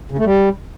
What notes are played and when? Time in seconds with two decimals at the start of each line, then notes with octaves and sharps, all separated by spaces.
0.11 C#3
0.18 A3
0.25 G3